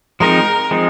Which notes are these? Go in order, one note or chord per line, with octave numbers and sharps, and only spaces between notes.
F3 G#3 C4 D#4 A#4
F3 G#3 C4 D#4